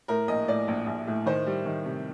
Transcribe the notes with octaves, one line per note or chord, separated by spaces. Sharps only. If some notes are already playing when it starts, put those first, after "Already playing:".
A2 A#4
A#1 D#5
A2 D5
A#1
A#1
A2
D#3 C5
G3
D#3
C3